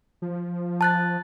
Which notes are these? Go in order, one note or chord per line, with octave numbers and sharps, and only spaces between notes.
F3
A5 F#6 A6